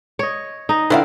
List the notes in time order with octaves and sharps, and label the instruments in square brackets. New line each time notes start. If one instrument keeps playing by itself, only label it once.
[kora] C#5 D#5
D#4 D#5
[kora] D3 C4 [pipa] B3 E4 F5